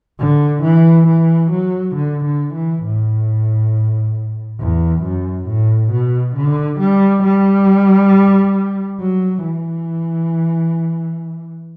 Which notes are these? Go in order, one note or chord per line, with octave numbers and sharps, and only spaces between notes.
D3
E3
E3
F#3
D3
D3
E3
A2
E2
F#2
A2
B2
D3
G3
G3
F#3
E3